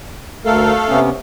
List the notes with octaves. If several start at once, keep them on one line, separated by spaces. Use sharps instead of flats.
D2 A3 A4 A#4 F5
C3 B3 C#4